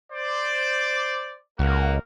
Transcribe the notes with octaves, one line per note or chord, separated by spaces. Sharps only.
C5 D5
C#2 A#3 F#4 A#4